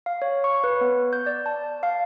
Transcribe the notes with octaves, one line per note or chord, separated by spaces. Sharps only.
F5
C#5
C#6
B4
B3
G6
D5
A5
F5